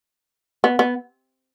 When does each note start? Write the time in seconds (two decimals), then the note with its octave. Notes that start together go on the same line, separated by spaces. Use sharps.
0.64 B3
0.79 B3